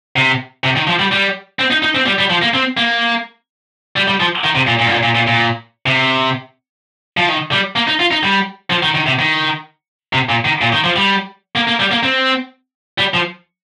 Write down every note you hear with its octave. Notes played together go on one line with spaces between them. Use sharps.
C3
C3
D#3
F3
G3
G3
C4
D#4
D#4
C4
G3
G3
F3
A#3
C4
A#3
G3
G3
F3
D#3
C3
A#2
A#2
G2
A#2
A#2
A#2
A#2
C3
F3
D#3
G3
A#3
D#4
F4
D#4
G3
F3
D#3
D#3
C3
D#3
C3
A#2
D#3
A#2
D#3
F3
G3
A#3
A#3
G3
A#3
C4
G3
F3